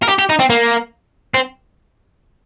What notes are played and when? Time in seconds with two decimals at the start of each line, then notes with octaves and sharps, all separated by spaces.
0.03 A#4
0.09 G4
0.19 G4
0.30 D#4
0.40 C4
0.50 A#3
1.34 C4